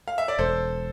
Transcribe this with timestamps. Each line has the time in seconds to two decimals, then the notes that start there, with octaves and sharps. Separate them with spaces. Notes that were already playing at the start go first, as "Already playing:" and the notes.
0.08 F5
0.18 E5
0.28 D5
0.39 E1 A4 C5